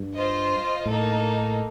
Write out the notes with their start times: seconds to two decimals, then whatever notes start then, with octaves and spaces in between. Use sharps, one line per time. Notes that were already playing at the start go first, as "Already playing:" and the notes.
Already playing: G2
0.15 F4 C5 D#5
0.85 A2 A#3 D#4 A4